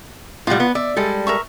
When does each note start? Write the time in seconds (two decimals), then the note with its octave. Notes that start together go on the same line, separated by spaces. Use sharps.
0.47 A2 G3 F4 F#5
0.60 B3
0.75 D5 E5
0.96 G3 G#3 A4
1.27 A#4 E5 C#6